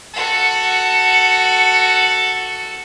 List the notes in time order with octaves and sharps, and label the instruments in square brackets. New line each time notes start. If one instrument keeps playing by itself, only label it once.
[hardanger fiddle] F#4 A4